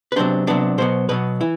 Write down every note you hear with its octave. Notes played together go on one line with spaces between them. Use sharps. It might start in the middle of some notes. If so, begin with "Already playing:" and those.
B4
C3 F#3 B3 D4 C5
C3 F#3 B3 D4 D5
B2 F#3 B3 C5
B2 F#3 B3 B4
E3 E4